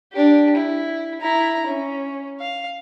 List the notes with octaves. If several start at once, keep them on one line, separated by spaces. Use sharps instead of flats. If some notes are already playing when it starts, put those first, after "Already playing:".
D4 G4
E4
E4 A#5
C#4
F5